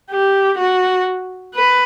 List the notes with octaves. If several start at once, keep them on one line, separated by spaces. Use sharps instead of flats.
G4
F#4
B4